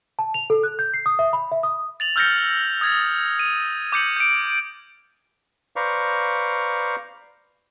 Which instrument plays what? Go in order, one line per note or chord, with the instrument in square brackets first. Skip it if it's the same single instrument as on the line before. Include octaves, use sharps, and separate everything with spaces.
[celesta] A5
F7
A4
F#6
G6
C7
D#6
E5
B5
E5
D#6
[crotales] A6 F7 F#7
E6 F6 G6 A6 A#6 C#7
D#6 G#6 A6
D#7
D6 G6 C#7 F#7
G6 D7
[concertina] B4 C5 D5 F5 A#5 C#6